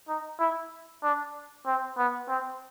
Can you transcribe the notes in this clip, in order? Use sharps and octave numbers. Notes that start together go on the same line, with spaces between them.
D#4
E4
D4
C4
B3
C4